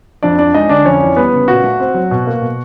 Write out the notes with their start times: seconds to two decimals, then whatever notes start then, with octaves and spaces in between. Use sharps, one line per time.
0.23 F2 D4 D5
0.38 F3 D4 D5
0.54 G#3 D#4 D#5
0.69 D3 D4 D5
0.85 F2 C#4 C#5
1.01 E3
1.16 G3 B3 B4
1.33 C#3
1.48 A#2 F#4
1.64 A3
1.80 C4
1.94 F#3
2.11 B2
2.27 A#3
2.41 B2